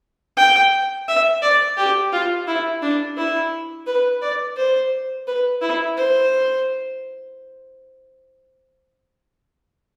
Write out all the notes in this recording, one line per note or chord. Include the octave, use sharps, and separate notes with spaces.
G5
E5
D5
G4
F4
E4
D4
E4
B4
D5
C5
B4
E4
C5